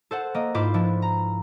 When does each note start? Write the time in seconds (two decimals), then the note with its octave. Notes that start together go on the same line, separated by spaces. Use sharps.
0.11 A4 C5 F#5
0.34 A#3 D#5
0.54 G#2 E4 F4 B4 C5 D6
0.74 F3 D4 E4
1.02 A#5